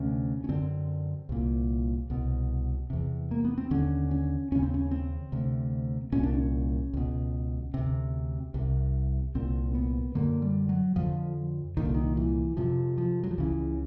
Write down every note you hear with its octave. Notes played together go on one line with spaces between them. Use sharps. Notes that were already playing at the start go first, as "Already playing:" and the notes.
Already playing: D2 C3 C#4
C#4
F#2 D3 C4
C2 A#2
C2 B2
E2 C3
A#3
B3
C4
D#2 D3 C#4
C#4
D#2 C#3 C#4
C4
C#4
C4
D2 C3
C2 A#2 C#4
D4
C#4
C#2 B2
D2 C3
C2 C3
C2 A#2 C4
B3
F#2 D3 A#3
G3
F#3
F2 D3 F3
C2 A#2 D#3
D3
D#3
E3
F2 C3 F3
F3
F#3
F3
C#2 C#3 E3